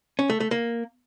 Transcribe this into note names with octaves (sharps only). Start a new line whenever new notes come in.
C#4
A3
A3
A#3